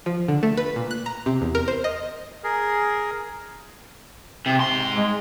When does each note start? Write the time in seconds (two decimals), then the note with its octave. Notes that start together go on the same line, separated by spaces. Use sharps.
0.06 F3
0.28 D3
0.43 A3
0.57 B4
0.76 A#2
0.91 F#6
1.06 A#5
1.26 C3
1.42 E2
1.55 A#4
1.68 C5
1.84 D#5
2.44 G#4 A#4
4.46 C3
4.60 G#2 C6
4.95 G#3